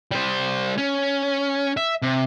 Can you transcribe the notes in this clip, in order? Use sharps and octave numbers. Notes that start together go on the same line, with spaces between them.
G3 C5
C#4
E5
C3